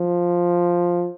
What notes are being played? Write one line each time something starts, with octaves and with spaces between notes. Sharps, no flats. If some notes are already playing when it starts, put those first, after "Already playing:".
Already playing: F3